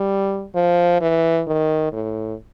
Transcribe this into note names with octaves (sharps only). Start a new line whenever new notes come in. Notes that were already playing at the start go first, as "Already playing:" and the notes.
Already playing: G3
F3
E3
D#3
A2